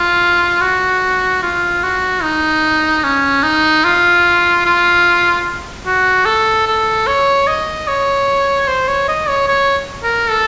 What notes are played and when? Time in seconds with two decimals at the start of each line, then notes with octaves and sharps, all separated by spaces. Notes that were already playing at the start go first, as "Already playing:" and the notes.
Already playing: F4
0.61 F#4
1.43 F4
1.83 F#4
2.23 D#4
3.04 C#4
3.43 D#4
3.84 F4
4.65 F4
5.86 F#4
6.26 A4
6.67 A4
7.07 C#5
7.48 D#5
7.88 C#5
8.68 C5
8.88 C#5
9.08 D#5
9.29 C#5
9.48 C#5
10.03 A#4
10.30 A4